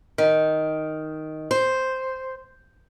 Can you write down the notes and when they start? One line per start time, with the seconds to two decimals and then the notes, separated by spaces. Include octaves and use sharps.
0.18 D#3
1.51 C5